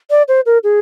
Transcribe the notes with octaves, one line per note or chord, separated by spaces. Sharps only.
D5
C5
A#4
G#4